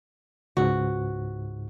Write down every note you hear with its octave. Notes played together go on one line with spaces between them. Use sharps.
C#2 G#2 F#4